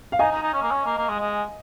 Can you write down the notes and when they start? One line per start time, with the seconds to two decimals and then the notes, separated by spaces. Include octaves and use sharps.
0.12 F5
0.19 D#4 D#5 G#5
0.31 D#4
0.42 D#4
0.53 C#4
0.62 A#3
0.71 C#4
0.85 A#3
0.97 A#3
1.08 G#3
1.19 G#3